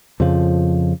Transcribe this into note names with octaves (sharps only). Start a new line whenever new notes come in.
F2 C#3 F3